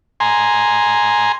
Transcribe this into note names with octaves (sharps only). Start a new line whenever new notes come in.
G#5 A#5 C6